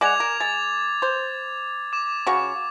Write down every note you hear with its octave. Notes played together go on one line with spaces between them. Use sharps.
G#3 D5 F#5 D6 G#6 F7
A#4
G#3 A6
C5
D6 E7
C#3 F#4 C#6